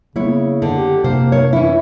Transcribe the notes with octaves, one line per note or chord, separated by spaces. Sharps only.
C#3 A#3 B3 E4 C#5
D3
G4
C3 A#3 C5
C#5
E3 C#4 E4